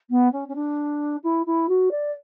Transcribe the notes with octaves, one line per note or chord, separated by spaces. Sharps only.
B3
C#4
C#4
D4
E4
E4
F#4
D5